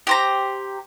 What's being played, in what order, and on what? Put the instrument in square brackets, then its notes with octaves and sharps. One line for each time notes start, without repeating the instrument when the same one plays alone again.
[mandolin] G4 C5 A#5